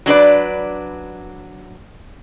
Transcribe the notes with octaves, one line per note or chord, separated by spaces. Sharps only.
F#3 D4 B4 D5